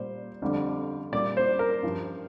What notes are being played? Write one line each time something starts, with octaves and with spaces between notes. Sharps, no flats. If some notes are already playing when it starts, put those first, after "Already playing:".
Already playing: A#2 G3 C5
F2 D3 G3
A#2 G3 D5
C5
A#4
G2 F3